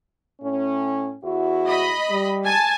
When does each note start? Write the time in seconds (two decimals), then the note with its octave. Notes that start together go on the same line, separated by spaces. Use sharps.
0.41 A2 C#4
1.23 E2 E4 F#4
1.67 D#5 B5
2.10 G3
2.45 G#5 A5